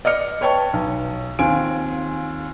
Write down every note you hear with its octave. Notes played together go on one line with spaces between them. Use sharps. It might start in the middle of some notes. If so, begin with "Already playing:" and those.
D5 D#5 F6 C#7
B4 C#5 G5 A5 C#6
B1
D#2 C4 F4 G#5 D7